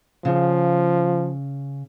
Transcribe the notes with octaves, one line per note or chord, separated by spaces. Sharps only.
C#3 F3